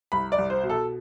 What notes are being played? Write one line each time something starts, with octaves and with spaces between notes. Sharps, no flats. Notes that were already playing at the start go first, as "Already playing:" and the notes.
C2 B5
D5
C2
C5
B2
A4